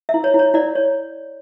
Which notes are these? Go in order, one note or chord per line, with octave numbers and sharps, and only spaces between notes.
E5
E4
C#5
E4
C#5
E4 D5
C#5